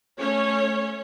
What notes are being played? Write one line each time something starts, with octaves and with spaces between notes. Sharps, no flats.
A3 C#4 C#5